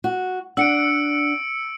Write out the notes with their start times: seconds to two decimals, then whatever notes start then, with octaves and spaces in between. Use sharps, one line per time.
0.04 F#4
0.57 D4 F#5 E6 C#7 D7